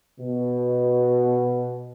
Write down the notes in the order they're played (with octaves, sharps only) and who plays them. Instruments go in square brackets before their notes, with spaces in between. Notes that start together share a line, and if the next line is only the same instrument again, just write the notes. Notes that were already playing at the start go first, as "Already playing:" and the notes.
[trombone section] B2